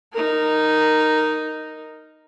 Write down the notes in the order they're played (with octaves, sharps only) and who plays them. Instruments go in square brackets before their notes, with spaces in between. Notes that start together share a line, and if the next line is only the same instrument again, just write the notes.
[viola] D#4 A#4